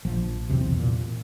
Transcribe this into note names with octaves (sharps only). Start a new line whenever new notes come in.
A#1 F3
B1 E2 C3
A#2